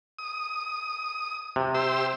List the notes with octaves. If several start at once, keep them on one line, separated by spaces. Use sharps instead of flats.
D#6
C3
G4 C5 E6